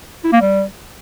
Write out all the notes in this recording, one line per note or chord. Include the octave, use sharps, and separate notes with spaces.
E4
A#3
G3